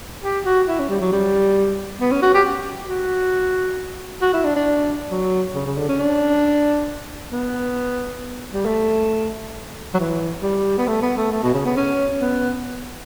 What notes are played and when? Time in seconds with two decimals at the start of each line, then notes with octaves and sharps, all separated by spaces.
0.24 G4
0.45 F#4
0.68 E4
0.79 C#4
0.89 G3
1.01 F#3
1.12 G3
2.01 B3
2.11 C#4
2.22 F#4
2.34 G4
2.89 F#4
4.22 F#4
4.33 E4
4.44 D4
4.56 D4
5.11 F#3
5.55 C#3
5.66 C#3
5.78 D3
5.89 C#4
6.00 D4
7.32 B3
8.53 G3
8.65 A3
9.94 F#3
9.99 E3
10.42 G3
10.78 B3
10.87 A3
11.02 B3
11.17 A3
11.31 A3
11.43 B2
11.54 C#3
11.65 B3
11.76 C#4
12.21 B3